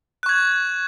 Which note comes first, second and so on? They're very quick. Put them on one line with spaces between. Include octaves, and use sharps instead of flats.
F#6 C#6 G#6